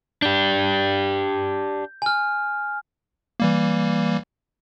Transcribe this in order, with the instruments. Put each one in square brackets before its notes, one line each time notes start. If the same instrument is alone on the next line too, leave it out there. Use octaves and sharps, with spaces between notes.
[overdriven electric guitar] D4 G4 [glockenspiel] G6
[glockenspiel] G#5 F6
[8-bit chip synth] E3 G3 A#3